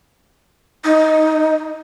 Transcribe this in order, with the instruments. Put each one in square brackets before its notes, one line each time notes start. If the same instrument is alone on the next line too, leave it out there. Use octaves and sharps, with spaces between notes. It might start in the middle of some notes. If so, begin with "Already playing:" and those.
[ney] D#4